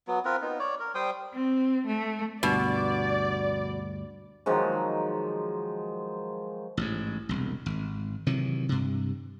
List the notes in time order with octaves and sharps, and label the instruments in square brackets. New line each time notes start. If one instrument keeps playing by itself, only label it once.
[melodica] F#3 B3
C4 F4 A#4 B4
B3 D#4
C#5 D5
A#4
G3 C5 G5 D#6
[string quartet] C4
A3
[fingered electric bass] D2 G2 [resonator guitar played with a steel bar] B2 [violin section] D5
[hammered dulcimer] D#3 F3 F#3 G#3
[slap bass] A1 G#2
E1 C2
G#1
C3 D#3 E3 F#3
G2 C3